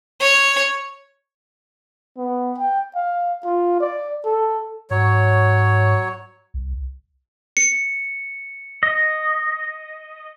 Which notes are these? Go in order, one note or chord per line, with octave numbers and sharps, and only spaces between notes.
C#5
B3
G5
F5
F4
D5
A4
G#2 F#3 C#5
C2
C#7
D#5